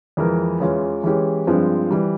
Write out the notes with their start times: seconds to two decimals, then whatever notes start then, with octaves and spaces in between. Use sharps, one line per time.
0.17 F2 E3 G#3 E4 A#4
0.60 E2 E3 G#3 C#4 F4
1.04 E3 G#3 C#4 G4
1.47 G2 F3 G#3 C4
1.91 E3 G3